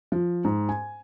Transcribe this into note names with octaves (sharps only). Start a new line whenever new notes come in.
F3
G#2
G#5